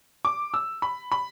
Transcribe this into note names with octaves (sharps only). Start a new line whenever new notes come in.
D6
E6
B5
B5